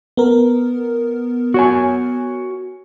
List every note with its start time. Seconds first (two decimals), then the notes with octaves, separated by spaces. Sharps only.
0.17 B3 A#4
1.54 F#4 C#5 G#5